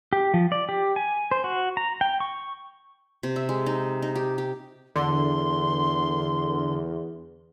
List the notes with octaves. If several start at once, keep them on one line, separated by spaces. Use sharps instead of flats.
G4
F3
D5
G4
G#5
C5
F#4
A#5
G5
C#6
C3
E5
G#3
D#4
D#4
G4
G4
E2 D3 C6